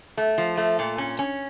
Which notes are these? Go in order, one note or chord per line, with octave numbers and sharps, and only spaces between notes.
A3
F3
A3
A#2
C#4
C#4